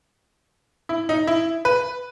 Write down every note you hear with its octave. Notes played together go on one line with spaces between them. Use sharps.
E4
D#4
E4
B4